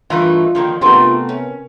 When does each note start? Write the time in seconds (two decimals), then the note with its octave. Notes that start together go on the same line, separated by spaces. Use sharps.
0.10 G2 E3 A3 D#4 F4 A#4 B4
0.55 D3 D#3 F3 A#3
0.81 C3 A3 B3 C4 D4 F4 F#4 A#4
1.29 C#4